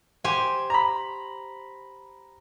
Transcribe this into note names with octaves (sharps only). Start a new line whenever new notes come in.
G4 C5 G#5
A#5 B5